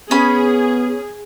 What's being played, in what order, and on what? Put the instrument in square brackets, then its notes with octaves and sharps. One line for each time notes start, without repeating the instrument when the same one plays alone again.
[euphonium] B3 [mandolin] C#4 B5 [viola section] G#4